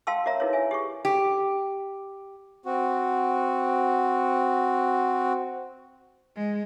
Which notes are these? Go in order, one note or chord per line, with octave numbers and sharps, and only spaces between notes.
F#4 F5 G5 A5 C6 E6
F#4 A#4 C#5 E5 A#5
D#4 E4 G#4 A#4 B4 C#5
E5 G#5
G4 G#4 C#6
G4
C4 F#4
G#3